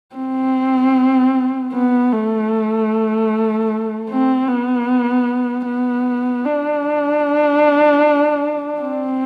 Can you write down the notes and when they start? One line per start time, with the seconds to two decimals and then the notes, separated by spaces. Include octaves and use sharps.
0.15 C4
1.73 B3
2.13 A3
4.09 C4
4.48 B3
5.66 B3
6.45 D4
8.81 C4